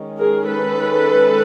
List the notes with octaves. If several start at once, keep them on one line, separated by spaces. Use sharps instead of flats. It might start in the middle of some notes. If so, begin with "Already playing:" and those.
Already playing: D#3 G#3 C#4
G#4 A#4
A4 B4